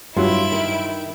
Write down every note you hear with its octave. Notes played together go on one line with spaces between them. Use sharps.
G2 F#3 E4 F4 D7
D#3